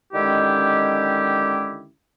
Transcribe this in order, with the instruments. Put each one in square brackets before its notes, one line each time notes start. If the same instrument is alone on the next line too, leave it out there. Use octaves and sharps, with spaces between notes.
[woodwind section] D3 D#3 G#3 C#4 E4 G4